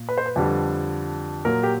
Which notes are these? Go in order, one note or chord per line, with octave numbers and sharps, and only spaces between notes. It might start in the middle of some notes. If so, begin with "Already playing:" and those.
Already playing: A#2
B4
C5
B4
F2 D3 G3
A#2 F#3 A#4
G4